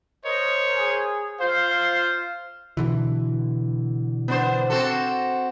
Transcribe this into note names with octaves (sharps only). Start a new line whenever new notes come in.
A#4 C5 C#5 D#5
G#4
F4 C5 F5
B2 D3 E3
B3 D4 C5
C4 F#4 A4